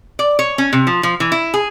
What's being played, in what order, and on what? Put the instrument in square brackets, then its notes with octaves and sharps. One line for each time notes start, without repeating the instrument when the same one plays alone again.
[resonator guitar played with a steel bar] D5
C#5
C#4
C3
F3
F3
E3
E4
G#4